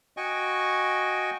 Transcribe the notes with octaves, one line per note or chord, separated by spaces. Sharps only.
F#4 D#5 G5 G#5 C#6